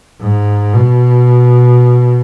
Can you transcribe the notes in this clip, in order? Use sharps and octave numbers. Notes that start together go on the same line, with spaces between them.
G#2
B2